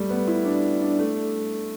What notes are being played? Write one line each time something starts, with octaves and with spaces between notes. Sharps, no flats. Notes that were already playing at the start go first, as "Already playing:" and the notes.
Already playing: G3 A3
B3
E4
D4
D4
A3